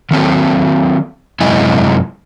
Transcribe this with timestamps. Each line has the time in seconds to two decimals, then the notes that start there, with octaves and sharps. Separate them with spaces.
0.11 D#3 F#3 C4 A4
1.41 F#2 C3 G#3 E4 D#5 G#5